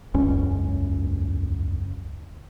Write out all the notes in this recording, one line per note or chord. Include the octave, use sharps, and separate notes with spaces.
E1 C#2 F#2 C#4